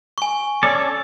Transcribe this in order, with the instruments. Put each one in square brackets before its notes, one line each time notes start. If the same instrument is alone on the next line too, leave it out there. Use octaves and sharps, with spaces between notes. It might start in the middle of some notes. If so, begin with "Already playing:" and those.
[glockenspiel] G#5 C#6
[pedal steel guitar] C#4 A4 D5